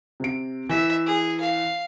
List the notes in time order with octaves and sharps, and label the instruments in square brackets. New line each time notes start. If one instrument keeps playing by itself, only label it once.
[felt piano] C3 D7
[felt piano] E3 [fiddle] E5
[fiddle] G#4
F5